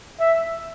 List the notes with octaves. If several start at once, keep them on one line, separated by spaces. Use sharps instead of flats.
E5